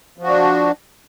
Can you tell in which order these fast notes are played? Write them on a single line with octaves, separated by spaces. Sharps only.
F3 F#4 D4